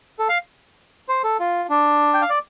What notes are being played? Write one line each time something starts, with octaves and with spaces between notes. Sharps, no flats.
A4
F5
C5
A4
F4
D4
G5
F5
D5